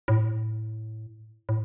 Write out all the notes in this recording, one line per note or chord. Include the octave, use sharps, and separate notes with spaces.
A2
A2